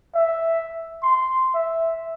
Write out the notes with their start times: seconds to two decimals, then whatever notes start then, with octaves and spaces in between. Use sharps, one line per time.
0.15 E5
1.03 C6
1.54 E5